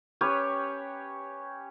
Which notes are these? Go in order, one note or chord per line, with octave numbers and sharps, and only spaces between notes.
C#4 G4 B4 C#5